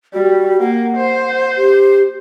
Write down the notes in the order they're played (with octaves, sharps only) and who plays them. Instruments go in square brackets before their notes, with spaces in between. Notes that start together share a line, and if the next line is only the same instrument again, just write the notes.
[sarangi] G3 [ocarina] F#4
[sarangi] A#3 [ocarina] F#5
[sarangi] C5
[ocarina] G4